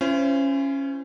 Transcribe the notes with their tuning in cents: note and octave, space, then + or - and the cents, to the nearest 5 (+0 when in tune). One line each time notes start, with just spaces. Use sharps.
C#4 -10 E4 +45 C5 -20